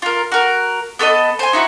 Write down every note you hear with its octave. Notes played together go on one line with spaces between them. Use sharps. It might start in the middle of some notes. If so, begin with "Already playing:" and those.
F4 A#4
F#4 A#4
B3 A4 C#5 D#5
C5 G#5
D#4 E4 F#4